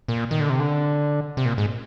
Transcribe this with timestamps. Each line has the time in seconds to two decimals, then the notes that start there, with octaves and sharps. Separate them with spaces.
0.08 A#2
0.31 D#3
0.40 D3
0.50 C3
0.59 D3
1.37 C3
1.45 A#2
1.58 G#2